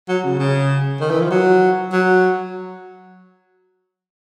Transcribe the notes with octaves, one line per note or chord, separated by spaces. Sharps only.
F#3
C#3
C#3
D#3
E3
F3
F#3
F#3